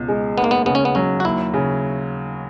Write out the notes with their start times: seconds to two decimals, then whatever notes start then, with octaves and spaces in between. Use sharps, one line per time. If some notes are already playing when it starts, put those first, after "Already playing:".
Already playing: C#2 B2
0.08 G#3
0.37 D#2 B3
0.44 A#3
0.51 B3
0.66 C#3 B3
0.75 C#4
0.85 B3
0.95 F#3 C#4
1.20 F#4
1.24 D#2 E4
1.54 C#3